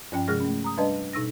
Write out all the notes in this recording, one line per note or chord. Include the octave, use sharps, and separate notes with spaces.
G2 F3 C#4 G5
C3 F3 G#3 G#4 F6 A#6
A3 C#4
A#5 D#6
G3 D4 B4 D5 D#5 A5
B2 D#4 E6 A#6